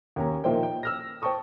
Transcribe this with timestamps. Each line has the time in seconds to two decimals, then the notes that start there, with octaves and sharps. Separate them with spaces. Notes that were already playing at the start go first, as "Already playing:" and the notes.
0.16 D#2 C#4 A#5
0.44 A#2 D#3 F3 C5 E5 G5
0.63 G5
0.83 E6 F6 A#6
1.22 C5 G5 A5 C#6 D#6